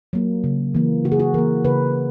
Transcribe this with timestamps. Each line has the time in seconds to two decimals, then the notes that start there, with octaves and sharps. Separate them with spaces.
0.13 F#3 A#3
0.44 C#3
0.75 E3 A#3
1.04 C#3 F#4
1.12 G#4
1.20 F#4
1.34 E3 A#3 A#4
1.65 C#3 B4